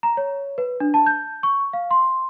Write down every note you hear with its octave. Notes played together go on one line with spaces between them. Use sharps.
A#5
C#5
B4
D4
A5
G6
C#6
F5
C6